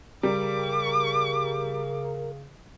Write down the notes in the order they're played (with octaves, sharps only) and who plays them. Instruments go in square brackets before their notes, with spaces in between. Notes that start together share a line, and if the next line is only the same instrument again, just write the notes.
[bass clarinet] C#3 [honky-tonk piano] G3 [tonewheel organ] A#4 [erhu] D6